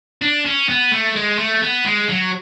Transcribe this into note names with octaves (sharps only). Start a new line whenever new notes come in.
D4
C#4
B3
A3
G#3
A3
B3
G#3
F#3